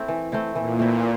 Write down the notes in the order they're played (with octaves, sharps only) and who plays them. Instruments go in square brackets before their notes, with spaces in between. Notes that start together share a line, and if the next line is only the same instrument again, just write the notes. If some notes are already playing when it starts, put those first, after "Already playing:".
Already playing: [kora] A3 C4 E4
E3
A3 C4 E4
[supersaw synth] A#2 [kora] E3
[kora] A3 C4 E4